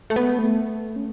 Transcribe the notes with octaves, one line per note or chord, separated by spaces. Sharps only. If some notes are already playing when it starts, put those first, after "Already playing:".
A3
B3
A3
C#4